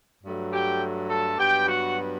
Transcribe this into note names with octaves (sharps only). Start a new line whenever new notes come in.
G2 F#3 A3
G4 G5
A4 A5
G2 F#3 B3 G4 G5
F#4 F#5